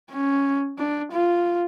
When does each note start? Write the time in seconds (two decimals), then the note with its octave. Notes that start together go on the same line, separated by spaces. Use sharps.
0.11 C#4
0.78 D4
1.12 F4